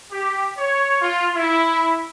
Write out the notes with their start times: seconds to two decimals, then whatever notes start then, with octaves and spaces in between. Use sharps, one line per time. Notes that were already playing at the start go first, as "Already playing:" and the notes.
0.10 G4
0.57 C#5
1.00 F4
1.34 E4